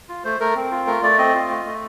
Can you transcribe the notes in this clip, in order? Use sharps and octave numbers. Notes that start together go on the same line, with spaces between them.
F4
A3 C5
A3 A#4
C4
F4
A3 A#4
A3 D5
C4 D#5
F4
A3
A3